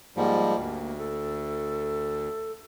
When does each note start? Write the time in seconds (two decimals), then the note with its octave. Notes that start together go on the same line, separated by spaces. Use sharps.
0.17 G#2 F3 G3 A#3
0.56 D2
0.98 A4